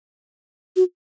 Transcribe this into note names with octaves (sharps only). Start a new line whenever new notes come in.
F#4